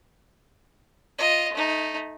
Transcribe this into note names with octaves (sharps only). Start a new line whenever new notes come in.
F4 D#5
A3 D#4